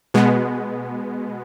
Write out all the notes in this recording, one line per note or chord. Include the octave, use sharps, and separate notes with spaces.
B2 G#3 B3